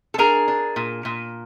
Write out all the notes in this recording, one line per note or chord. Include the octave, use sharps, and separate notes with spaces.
A4
D4 G#4 A#4
D4
A#2
A#2